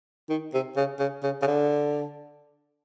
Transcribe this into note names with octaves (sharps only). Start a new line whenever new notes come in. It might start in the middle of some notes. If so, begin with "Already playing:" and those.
D#3
C3
C#3
C#3
C#3
C#3
D3